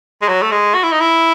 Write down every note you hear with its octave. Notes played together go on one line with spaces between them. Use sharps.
G#3
F#3
A3
G#3
F#4
E4
D#4
E4